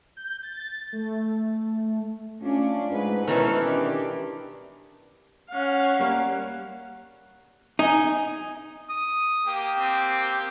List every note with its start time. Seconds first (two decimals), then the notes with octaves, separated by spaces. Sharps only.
0.17 G6
0.43 A6
0.93 A3
2.43 A3 C#4 D4 F4
2.91 G#2 G#3 A3 B4
3.28 B2 D#3 E3 C#4 E4 A4 B4
3.65 D4 G4
5.51 C#4 F5 F#5
5.99 G3 A#3
7.79 D#4 D#5 G#5
8.90 D#6
9.47 A#3 G4 G5
9.78 C4